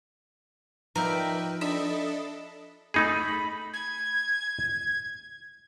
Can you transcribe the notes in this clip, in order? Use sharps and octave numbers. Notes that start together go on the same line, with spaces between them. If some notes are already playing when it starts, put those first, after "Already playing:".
F3 D#4 A#4 B4 D5 E5 G5
D4 A4 D#5 E5 B5
A3 D#4 G#4 B5
G#6